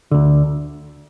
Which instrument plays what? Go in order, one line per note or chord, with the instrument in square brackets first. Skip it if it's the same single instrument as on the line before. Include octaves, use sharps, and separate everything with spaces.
[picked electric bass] D2 D3